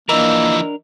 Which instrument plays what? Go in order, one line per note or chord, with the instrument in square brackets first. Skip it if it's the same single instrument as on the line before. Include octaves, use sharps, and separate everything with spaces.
[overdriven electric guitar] E3 F3 [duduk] A#3 [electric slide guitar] D4 A#4 [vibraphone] D#5 E6